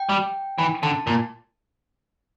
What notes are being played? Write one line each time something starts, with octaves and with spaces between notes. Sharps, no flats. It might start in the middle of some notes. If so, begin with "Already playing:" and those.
Already playing: G5
G3
E3
D3 A5
A#2